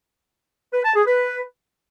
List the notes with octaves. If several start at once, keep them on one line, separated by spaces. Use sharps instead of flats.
B4
A5
G#4
B4